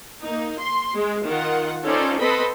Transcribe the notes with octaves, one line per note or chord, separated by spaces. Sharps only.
A#3 D#4
C6
G#3
D#3 F4 F#5
C#4 D#4 F4 A4 C5 D5
C4 A4 B4 D#5 B5 C6